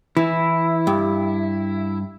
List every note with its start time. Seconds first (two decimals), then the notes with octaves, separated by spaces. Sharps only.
0.17 E3 E4
0.87 G2